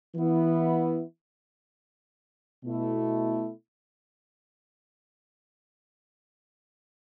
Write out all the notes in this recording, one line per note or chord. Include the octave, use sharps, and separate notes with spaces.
E3 B3 E4
B2 A3 E4